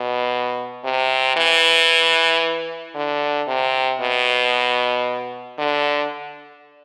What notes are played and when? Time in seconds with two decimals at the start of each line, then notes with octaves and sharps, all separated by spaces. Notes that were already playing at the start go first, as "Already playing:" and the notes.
Already playing: B2
0.84 C3
1.36 E3
2.95 D3
3.48 C3
4.01 B2
5.58 D3